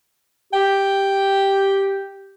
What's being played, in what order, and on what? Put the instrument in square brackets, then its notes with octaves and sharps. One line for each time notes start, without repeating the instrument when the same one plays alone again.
[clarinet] G4 [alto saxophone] G5